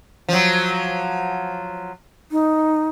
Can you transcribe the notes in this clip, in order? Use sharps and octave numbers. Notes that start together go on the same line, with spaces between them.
F3 F#3
D#4